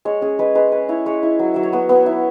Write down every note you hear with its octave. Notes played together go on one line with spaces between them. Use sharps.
G#3 C#5
C#4 G#4
G#3 B4
G#3 B4
C#4 B4
E4 C#5
G#3 C#5
E4
F#3
F#3 E5
C#5
B3 B4
B3
E4